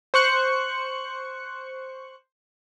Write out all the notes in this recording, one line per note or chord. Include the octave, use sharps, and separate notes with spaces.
C5 C#6 F#6 C#7